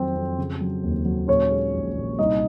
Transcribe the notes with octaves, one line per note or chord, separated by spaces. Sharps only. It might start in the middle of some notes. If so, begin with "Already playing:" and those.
Already playing: F2 D#3 F#3 C4
F2
C#3
F#3
D#2
F#3
A#2 C#4 C#5
G#3
A#1
A#2
C2 D#4 D#5